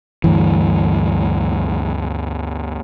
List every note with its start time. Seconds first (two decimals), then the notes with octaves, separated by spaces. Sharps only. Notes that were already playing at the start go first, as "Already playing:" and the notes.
0.24 D2 G2 E3